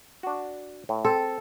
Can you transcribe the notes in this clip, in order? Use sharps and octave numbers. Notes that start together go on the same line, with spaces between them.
D4 F#4
A2
C4 A4